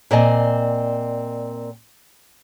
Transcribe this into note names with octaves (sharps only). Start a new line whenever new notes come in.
A#2 C4 D5 D#5 G#5